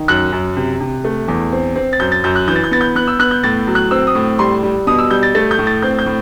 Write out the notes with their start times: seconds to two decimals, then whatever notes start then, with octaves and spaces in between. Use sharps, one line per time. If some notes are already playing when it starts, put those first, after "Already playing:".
Already playing: D#3
0.08 F#2 F#6
0.32 F#2
0.56 C3
0.80 C3
1.04 A3
1.28 E2
1.52 C4
1.75 C4
1.93 A6
2.00 F#2 G6
2.12 A6
2.24 F#2 G6
2.35 F#6
2.48 E3 G6
2.56 A6
2.64 G6
2.71 B3 A6
2.81 G6
2.95 B3 F#6
3.07 E6
3.19 B3 F#6
3.31 G6
3.43 A2 A6
3.67 F#3
3.75 F#6
3.91 C4 E6
4.07 D#6
4.15 A2
4.39 G3 C6
4.63 G3
4.87 B2 D#6
4.98 E6
5.10 G3 G6
5.23 A6
5.35 A3 A6
5.51 G6
5.58 A2
5.67 A6
5.82 C4 G6
5.99 G6
6.06 A2